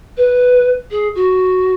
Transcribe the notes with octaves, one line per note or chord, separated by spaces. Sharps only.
B4
G#4
F#4